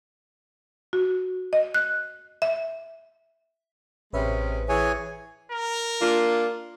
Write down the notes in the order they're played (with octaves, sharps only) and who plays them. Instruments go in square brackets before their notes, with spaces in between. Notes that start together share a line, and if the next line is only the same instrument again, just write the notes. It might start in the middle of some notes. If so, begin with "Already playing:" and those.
[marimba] F#4
D#5
F#6
E5
[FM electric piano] A1 B4 E5 [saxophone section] C3 G#3 C#4
[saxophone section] E3 [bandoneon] G#4 C#5 G#5
[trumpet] A#4
[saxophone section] A#3 D4 F4